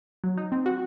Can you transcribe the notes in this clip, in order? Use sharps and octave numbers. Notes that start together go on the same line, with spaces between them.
F#3
D#4
C4
F#4